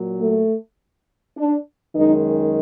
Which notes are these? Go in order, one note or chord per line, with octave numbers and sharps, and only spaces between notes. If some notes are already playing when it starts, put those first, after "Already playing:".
Already playing: A#2 F#3
A3
D4
F#2 D#3 G#3 D#4